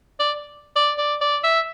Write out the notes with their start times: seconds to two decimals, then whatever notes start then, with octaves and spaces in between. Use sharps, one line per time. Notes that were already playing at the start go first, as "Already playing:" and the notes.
0.20 D5
0.76 D5
0.98 D5
1.21 D5
1.44 E5